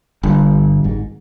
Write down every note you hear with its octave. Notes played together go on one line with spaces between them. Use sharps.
G1 G2
G#1 G#2